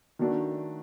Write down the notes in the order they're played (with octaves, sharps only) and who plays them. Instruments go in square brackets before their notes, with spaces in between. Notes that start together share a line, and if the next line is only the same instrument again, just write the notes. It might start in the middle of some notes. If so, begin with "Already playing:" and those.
[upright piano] D#3 F#3 A3 D4 F#4